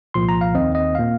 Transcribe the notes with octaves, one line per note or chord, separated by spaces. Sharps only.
C2 A#2 F3 C6
A#5
F5
D#2 D#3 C4 D#5
D#5
A#2 A#3 F5